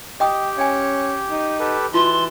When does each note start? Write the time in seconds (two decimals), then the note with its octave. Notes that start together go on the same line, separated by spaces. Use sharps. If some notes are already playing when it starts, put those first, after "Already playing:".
0.20 G4 D#5 G5 D#6
0.58 C#4 F5 G#5
1.31 D#4
1.60 G4 A4 B4
1.94 E3 F4 F#4 A5 C6